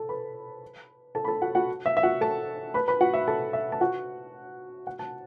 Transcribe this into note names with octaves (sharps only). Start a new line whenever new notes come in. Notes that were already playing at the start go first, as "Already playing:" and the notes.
Already playing: A4 A5
B4 B5
A4 A5
B5
A4 A5
F#4 F#5
F#4 F#5
E5
E5
F#4 F#5
A4 A5
B4 B5
B4 B5
F#4 F#5
E5
A4 A5
E5
A5
F#4 F#5
F#5
A5